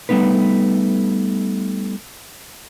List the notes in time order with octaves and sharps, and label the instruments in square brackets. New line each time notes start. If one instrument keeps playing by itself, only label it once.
[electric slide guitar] G3 A3 B3 D#4 B4